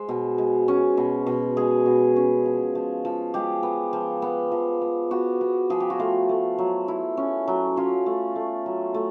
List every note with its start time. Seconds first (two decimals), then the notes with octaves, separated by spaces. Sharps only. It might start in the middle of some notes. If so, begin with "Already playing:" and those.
Already playing: G#3 C5
0.09 B2
0.38 G#3
0.68 C#4
0.97 B2
1.27 B2
1.57 G#3 G#4
1.86 B2
2.16 C#4
2.46 F3
2.75 F3
3.05 F3
3.34 G#3 G4
3.63 B3
3.93 F3
4.22 B3
4.52 F3
4.81 B3
5.11 B3 F#4
5.41 B3
5.70 F3 G#4
5.80 G4
5.90 F#4
5.99 A3 F4
6.29 A3
6.58 F#3
6.88 E4
7.17 C#4
7.48 F#3
7.77 C#4 F4
8.06 A3
8.36 A3
8.66 F#3
8.94 A3